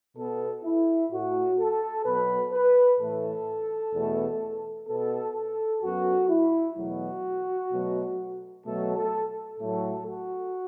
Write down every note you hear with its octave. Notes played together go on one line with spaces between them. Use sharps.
B2 B3 A4
E4
A2 A3 F#4
A4
B2 F#3 B3 B4
B4
A2 E3 A3 A4
E2 B2 A3
B2 B3 A4
A4
F#2 F#3 B3 F#4
E4
E2 B2 F#3 A3 F#4
B2 F#3 A3
B2 F#3 A3 A4
A4
A2 F#3 A3 A4
F#4